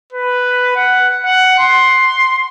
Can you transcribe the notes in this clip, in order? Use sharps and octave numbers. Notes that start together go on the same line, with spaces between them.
B4
F#5
F#5
C6